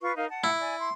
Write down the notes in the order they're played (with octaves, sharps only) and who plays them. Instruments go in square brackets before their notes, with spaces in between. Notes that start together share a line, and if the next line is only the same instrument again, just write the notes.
[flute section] F4 B4 C#6
D#4 A#4 F5
F#5 A5
[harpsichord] E4
[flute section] D5 G#5
C6